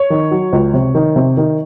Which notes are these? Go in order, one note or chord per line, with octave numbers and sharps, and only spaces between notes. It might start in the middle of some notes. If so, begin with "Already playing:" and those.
Already playing: C#5
D#3
F#3
C#2
C3
D#3
C3
D#3